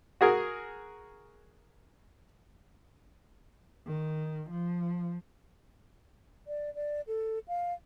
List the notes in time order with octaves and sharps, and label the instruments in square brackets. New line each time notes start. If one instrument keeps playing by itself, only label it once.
[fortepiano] F#4 G#4 A#4
[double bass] D#3
F3
[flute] D5
D5
A4
F5